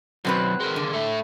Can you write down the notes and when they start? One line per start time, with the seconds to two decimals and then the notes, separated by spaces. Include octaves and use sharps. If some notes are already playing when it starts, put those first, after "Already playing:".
0.25 F#2 B2 F#3 C4 B4
0.60 G#3 A#3
0.76 D3
0.93 A3 E4